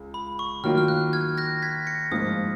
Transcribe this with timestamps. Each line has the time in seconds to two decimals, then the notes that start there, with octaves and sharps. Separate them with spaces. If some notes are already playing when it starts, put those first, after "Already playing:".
Already playing: C#2
0.14 B5
0.39 C#6
0.64 D#3 F#3 A#3 F4 F6
0.78 F6
0.88 F#6
1.13 F6 G#6
1.38 F#6 A#6
1.62 G#6 B6
1.87 A#6 C#7
2.12 G#2 F3 A#3 F4 D#6